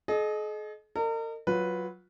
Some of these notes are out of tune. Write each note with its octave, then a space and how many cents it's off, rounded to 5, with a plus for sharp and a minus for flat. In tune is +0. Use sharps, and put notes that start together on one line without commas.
G#4 +45 D#5 -15
A#4 -40 D#5 -25
F#3 +0 F4 +20 B4 +0